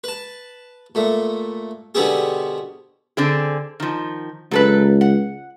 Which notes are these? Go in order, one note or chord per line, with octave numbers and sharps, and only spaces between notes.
B4 A5
A#2 A3
B2 D3 G3 B3 C4 G#4
D3 C4 G#4
D#3 F3
C#2 F#3 A4 B4
F#5